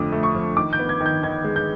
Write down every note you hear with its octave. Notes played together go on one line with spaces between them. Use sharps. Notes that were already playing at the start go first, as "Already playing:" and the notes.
Already playing: F2 D3 F3 A3 D6 D#6
A3
C#6
F3
D#3 D6
G6
B3
G#6
D#3
G6
D#3 G#6
G#3
G6